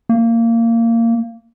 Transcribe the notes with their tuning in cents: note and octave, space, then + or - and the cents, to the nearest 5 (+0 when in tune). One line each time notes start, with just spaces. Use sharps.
A#3 -20